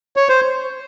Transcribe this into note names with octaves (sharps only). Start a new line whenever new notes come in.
C#5
C5